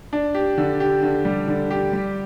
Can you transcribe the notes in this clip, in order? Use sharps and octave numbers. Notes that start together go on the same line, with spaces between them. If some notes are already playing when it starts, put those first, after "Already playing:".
D4
G4
D3
G4
D3
G3
D3
G4
G3